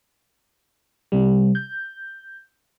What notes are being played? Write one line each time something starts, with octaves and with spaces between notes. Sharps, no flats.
C3 G3
G6